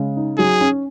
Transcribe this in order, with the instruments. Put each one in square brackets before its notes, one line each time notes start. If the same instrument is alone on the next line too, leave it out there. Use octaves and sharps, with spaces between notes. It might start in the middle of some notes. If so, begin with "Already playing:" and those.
Already playing: [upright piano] C#3 G#3
D#4
[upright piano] F#3 [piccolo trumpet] G#4
[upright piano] C#4